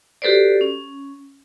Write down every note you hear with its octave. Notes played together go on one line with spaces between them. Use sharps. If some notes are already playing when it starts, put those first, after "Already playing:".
F#4 G4 A4 B4 C5 D5
C#4